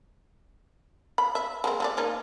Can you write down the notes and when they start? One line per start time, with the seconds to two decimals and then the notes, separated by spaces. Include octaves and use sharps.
1.18 B5
1.35 E5
1.64 G#3 A#3 C4
1.80 G#3 A4 D5
1.97 A#3 C#4 D#4